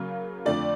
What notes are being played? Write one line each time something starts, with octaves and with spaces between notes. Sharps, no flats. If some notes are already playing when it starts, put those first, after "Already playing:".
Already playing: C#3 F#3 A#3
F2 D3 F3 A3 D5